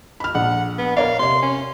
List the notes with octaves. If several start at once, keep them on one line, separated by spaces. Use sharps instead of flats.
B5 F6
A#1 F#5
B3
A#4 C#5 D5 F5
C3 C#5 C6
C#4